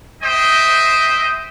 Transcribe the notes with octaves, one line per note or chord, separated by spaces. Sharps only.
C5 D#5 E5 G5